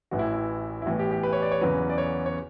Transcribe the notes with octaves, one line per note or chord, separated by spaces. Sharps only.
A1 A2 E3 F#4
E4
E4
E4
A1 A2 E3 B3 F#4
G4
G4
B4
C#5
D5
C#5
E2 C#3 F#3 B3 B4
D5
C#5
C#5